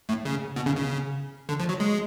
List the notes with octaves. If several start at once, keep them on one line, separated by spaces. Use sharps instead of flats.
A2
C#3
B2
C#3
C#3
D3
F3
F#3
G#3